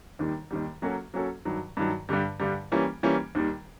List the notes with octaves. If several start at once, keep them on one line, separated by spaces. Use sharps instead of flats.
D#2 D#3 G3
D#2 D#3 G3
F#3 A#3 C#4 F#4 A4
F#3 A#3 C#4 F#4 A4
G2 D#3 F#3
G2 D#3 F#3
G2 D3 G3
G2 D3 G3
E3 G3 A#3 C#4
E3 G3 A#3 C#4
D#2 D#3 G3